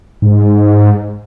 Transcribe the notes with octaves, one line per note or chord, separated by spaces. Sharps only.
G#2